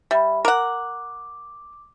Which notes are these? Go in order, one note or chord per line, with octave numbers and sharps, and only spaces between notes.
G3 E5 B5
A#4 F#5 D6